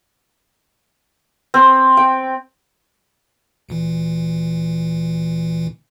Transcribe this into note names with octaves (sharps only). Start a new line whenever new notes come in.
C4
G5
D2 A#2 E3